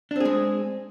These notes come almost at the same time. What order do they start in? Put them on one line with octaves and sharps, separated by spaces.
D4 C4 G#4 G#3